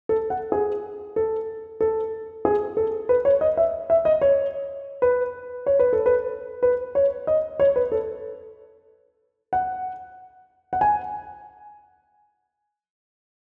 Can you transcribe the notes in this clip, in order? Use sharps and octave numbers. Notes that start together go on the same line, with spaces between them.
A4
F#5
G#4
A4
A4
G#4
A4
B4
C#5
D#5
E5
E5
D#5
C#5
B4
C#5
B4
A4
B4
B4
C#5
D#5
C#5
B4
A4
F#5
F#5
G#5